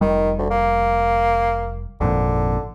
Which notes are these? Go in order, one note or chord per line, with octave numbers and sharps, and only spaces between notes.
F1 D#3 G3
D2
A#3
G#1 F2 A#2 D3